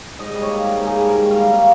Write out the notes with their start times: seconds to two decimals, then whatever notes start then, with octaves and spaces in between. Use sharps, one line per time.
0.19 G#2 D#5
0.31 G3 D#5
0.42 C#5
0.49 A#3
0.64 G#2 A#4
0.79 G#2
0.86 G#4
0.94 G3
1.08 G#2 A#4
1.24 D#3
1.31 F5
1.38 G3
1.53 A#3 F5